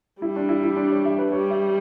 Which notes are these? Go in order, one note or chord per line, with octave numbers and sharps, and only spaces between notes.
G3 E4
D4
E4
E4
D4
C#5
E5
B4
G3 C#5
E5